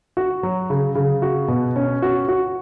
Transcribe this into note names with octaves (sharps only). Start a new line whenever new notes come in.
F#4
F#3
C#3
C#3
F#4
B2
C#4
F#4
F#4